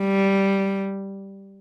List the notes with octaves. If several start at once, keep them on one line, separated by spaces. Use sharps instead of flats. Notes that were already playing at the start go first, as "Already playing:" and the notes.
Already playing: G3